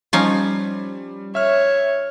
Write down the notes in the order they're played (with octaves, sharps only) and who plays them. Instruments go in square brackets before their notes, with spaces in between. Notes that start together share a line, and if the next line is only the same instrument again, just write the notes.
[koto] F3 C#4 D#4 [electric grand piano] G3
[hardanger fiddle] C#5 [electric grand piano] E5 F6